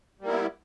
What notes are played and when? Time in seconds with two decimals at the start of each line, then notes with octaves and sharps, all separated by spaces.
0.21 G3
0.24 A#3
0.28 E4
0.31 B3